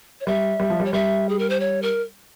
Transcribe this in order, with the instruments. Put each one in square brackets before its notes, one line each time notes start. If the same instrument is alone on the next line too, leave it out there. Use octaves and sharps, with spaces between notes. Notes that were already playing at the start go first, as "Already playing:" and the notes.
[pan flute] C#5
[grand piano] G3 [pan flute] E5
[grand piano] G3
F3
G3
[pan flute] C#5
[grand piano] G3 [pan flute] E5
[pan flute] G#4
A#4
C5
C#5
A#4